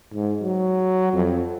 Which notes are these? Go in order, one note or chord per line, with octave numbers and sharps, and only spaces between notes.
G#2
F#3
F2